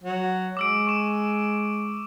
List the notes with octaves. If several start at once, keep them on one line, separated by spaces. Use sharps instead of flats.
F#3
G#3 D6 E6 D7
C#6 E7